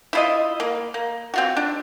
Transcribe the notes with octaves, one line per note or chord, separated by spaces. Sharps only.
E4 F4 D#5
A#3
A#3
C4 F4 F#4
D4